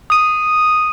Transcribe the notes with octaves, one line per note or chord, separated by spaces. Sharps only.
D#6 D#7